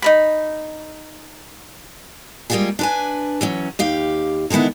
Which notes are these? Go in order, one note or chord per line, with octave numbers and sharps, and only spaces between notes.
D#4 A#4 B5
G3 G#3 A#3 F4 G4 G#4
D4 B4 G#5
E3 F#3 C#4
D#2 G4 F5
D3 D#3 G#3 B3 E4